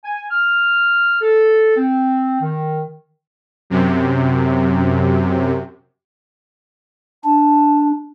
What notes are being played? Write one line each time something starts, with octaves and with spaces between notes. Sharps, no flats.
G#5
F6
A4
C4
D#3
F#2 C3
D4 A5